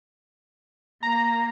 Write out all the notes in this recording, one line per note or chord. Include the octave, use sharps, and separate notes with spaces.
A#3 A#5